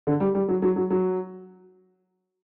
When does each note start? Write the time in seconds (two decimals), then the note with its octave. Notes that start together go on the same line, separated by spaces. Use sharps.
0.07 D3
0.20 G3
0.35 G3
0.49 F#3
0.62 F#3
0.76 F#3
0.90 F#3